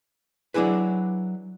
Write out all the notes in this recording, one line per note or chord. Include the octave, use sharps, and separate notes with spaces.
F#3 D4 E4 G#4 B4